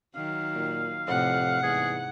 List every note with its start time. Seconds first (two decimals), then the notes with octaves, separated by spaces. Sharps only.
0.16 D#3 F#3 F5
0.55 A#2
1.07 F2 A2 C3 F#5
1.63 E2 G#2 G#4